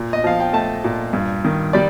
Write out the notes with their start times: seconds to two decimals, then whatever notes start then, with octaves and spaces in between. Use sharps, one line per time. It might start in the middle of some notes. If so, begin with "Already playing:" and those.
Already playing: A#2
0.13 D#5
0.24 F3 F5
0.40 G5
0.53 A3 A5
0.84 A#2
1.13 G2
1.44 D#3
1.73 G3 D5